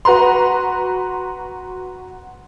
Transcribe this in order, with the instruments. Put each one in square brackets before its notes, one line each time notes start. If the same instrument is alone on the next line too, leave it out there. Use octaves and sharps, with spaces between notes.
[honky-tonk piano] F#4 B4 A#5 C6